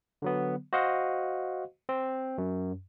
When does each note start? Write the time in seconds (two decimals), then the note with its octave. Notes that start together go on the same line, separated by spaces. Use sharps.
0.22 D3 F#3 B3
0.73 F#4 C5 D#5 F5 F#5
1.89 C4
2.38 F#2